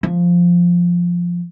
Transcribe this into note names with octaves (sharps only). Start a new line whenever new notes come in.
F3